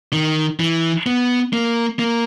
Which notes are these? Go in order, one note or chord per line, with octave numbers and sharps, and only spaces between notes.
D#3
E3
B3
A#3
A#3